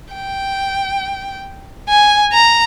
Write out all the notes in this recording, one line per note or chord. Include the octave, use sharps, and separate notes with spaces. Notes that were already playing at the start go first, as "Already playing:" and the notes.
G5
G#5
A#5